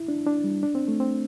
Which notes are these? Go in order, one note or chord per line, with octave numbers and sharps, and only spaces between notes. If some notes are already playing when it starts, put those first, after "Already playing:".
Already playing: E4
D4
D4
G3
D4
C4
A3
C4